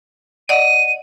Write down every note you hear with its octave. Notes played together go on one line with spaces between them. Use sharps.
D5 D#5 F#5 D#7